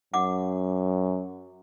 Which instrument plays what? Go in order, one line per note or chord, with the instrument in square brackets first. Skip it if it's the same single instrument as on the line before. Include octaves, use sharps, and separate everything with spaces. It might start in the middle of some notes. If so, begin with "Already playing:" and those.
[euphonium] F#2 [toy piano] F#5 D6